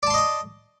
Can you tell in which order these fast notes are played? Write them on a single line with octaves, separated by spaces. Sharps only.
D5 A5 C6 D#5 D#6